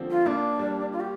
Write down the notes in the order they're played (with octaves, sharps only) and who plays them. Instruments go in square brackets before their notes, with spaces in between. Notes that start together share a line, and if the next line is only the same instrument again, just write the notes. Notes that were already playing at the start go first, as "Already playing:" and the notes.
Already playing: [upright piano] D3 F3 G3 A#3 C4
[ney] F4
[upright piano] A#3 [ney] D4
[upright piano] G3
[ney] F4
G4